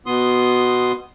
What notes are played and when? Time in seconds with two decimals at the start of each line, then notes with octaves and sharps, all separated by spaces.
0.06 B2 B3 C6 D#6